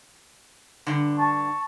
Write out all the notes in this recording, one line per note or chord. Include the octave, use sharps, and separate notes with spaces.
G2 D3
A5 C#6